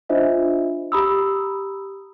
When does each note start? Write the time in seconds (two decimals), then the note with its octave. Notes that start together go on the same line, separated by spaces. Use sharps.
0.09 D4 F4 C5 D#5 E5
0.92 G4 A#5 B5 D#6 E6